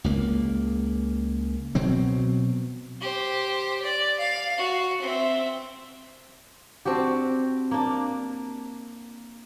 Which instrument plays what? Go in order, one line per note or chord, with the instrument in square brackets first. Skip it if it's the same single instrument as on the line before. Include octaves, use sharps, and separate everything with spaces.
[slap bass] C#2 A#3
B2 F#3 C4
[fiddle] G4 C5
D5
F5
F#4
C4 E5
[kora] C4 D4 F#4 G4
A#3 D4